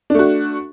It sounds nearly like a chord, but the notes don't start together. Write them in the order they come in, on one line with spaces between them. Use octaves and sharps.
D4 A3 F#4